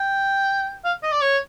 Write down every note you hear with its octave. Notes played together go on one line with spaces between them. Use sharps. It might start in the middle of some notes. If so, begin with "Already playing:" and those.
Already playing: G5
F5
D#5
D5
C#5